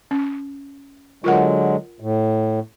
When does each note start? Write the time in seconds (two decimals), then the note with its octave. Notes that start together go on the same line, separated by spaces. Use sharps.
0.11 C#4
1.24 D3 F#3 G#3 F4 A#4 F#5
2.00 A2